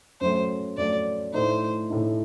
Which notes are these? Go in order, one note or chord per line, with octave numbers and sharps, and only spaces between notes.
F#2 F#3 A3 C5
F#2 F#3 A3 D5
A2 A3 D#4 C5
A2 A3 D#4